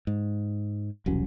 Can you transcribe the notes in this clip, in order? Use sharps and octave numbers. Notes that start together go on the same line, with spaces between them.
G#2
E1 C2 F#3 C#4